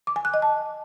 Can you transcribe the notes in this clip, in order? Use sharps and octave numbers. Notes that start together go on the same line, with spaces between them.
D6
G#5
F#6
D#5
A5